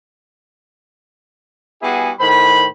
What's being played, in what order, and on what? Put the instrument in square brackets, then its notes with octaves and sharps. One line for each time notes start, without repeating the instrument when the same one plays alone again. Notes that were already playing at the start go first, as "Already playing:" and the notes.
[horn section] G3 B3 E4 F#4 G#4
A2 D#3 C5 B5